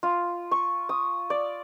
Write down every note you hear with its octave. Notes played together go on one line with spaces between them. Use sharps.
F4
C#6
D#6
D5